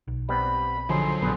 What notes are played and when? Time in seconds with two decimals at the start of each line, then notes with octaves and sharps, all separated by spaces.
0.08 B1
0.29 G3 B3 C4 B5
0.89 D3 F3 F#3 D#4 G#4 C6
1.22 A#1 G3 B3 G#4 B4